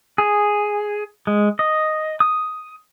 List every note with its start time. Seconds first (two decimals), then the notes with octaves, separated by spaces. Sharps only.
0.18 G#4
1.27 G#3
1.59 D#5
2.20 D#6